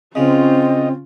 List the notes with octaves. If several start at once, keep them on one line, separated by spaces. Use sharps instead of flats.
C#3 C4 C#4 F4 D#5